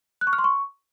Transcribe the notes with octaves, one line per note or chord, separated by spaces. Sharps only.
F#6
C#6
F6
C6
C#6